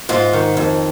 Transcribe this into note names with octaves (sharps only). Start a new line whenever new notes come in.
G#2 F4
D#3
F2